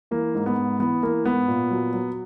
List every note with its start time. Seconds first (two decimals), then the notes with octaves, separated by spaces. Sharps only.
0.11 E3 A#3
0.34 G#2
0.46 B3
0.56 G#2
0.79 E3 B3
1.02 E3 A#3
1.25 G#2 B3
1.48 A#2
1.71 F#3
1.93 F#3